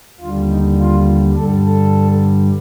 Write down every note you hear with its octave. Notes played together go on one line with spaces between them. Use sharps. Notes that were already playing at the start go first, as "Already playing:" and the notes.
D#2 D3 G3 F4
D#4
F4
G2 D3 G3 A4
A4